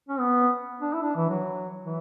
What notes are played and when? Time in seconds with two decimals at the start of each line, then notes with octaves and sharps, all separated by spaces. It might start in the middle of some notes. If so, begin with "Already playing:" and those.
0.09 C#4
0.20 B3
0.81 D4
0.94 E4
1.02 D4
1.16 E3
1.29 F#3
1.84 E3